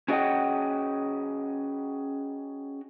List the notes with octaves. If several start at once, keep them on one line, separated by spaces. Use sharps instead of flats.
C#4 F#4 G#4 D#5 F#5 G5